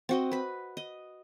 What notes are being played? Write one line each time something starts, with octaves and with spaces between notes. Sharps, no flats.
C4 F#4 D#5
B4 B5
D#5